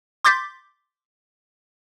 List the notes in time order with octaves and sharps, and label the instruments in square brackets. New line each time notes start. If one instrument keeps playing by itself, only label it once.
[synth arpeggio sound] C6 D6 G6 A6 B6